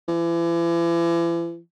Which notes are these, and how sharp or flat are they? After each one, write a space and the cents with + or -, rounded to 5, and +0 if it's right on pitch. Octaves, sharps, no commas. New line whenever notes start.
E3 +40